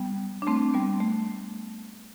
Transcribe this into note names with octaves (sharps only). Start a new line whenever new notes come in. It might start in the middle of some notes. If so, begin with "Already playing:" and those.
Already playing: G3 B3
D4
A3 C4
G3 B3
A3